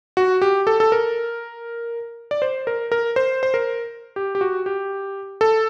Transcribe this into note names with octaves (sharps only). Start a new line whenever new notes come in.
F#4
G4
A4
A4
A#4
D5
C5
A#4
A#4
C5
C5
A#4
G4
G4
F#4
G4
A4